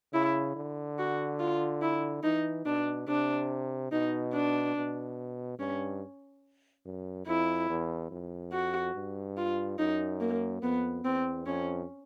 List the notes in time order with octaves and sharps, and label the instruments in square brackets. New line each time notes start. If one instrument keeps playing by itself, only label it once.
[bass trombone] C#3 [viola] E4
[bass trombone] D3
[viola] F#4
F4
E4
[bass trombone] E3 [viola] D#4
[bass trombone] B2 [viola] D4
[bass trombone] C3 [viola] D4
[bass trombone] B2 [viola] D#4
[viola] D4
[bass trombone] B2
[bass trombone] G2 [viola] C#4
[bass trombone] F#2
[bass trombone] F2 [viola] E4
[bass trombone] E2
F2
[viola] F#4
[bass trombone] G2
[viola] F4
[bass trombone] F#2 [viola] D#4
[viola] A#3
[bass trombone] F2 [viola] B3
[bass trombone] E2 [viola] C4
[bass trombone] F2 [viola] C#4